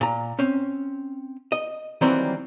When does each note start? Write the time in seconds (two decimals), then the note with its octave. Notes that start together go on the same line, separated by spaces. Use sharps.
0.01 A#2 A#5
0.39 C4 C#4
1.52 D#5
2.01 D#3 E3 F#3 G3 A#3 C4